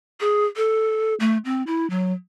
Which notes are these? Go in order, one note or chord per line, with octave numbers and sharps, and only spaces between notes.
G#4
A4
A3
C4
E4
F#3